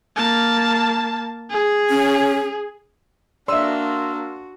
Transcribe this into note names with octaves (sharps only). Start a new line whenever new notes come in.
A#3 A5
G#4
C#4
A#3 D4 F#4 D5 E5 C6 E6